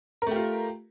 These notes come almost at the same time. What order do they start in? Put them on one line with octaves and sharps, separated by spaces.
A#4 A3 G4 F4